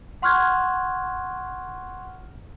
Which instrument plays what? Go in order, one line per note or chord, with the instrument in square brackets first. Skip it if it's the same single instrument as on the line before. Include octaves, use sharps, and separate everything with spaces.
[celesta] F#5 C6 C#6 F6 F#6 G#6